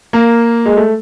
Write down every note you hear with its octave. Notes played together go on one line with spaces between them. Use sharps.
A#3
G#3
A3